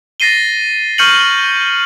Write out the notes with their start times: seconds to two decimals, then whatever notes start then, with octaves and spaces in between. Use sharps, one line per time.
0.20 A6 A#6 C7 D#7 G7
0.98 C#6 F6 G6 C#7 D#7 F#7